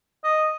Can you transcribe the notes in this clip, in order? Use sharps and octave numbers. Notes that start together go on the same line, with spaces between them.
D#5